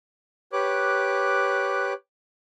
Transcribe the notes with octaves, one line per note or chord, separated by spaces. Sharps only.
G4 B4 C#5 D6 F#6